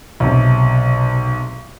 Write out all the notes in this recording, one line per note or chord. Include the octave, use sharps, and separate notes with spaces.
B1 C3